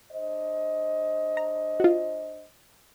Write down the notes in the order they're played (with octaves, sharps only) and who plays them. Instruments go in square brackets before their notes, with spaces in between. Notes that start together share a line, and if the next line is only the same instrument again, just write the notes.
[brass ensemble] D4 C5 D#5
[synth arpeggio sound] A#5
F4 F#4